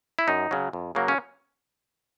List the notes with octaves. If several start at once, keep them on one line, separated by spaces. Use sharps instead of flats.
E4
F#2 D#4
C#3 F#3
F2
C#3 F#3 A#3
C#4